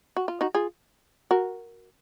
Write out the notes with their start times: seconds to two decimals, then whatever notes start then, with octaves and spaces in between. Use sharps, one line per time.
0.17 F#4
0.28 F4
0.41 D#4 F#4
0.55 F4 G#4
1.31 F#4 A#4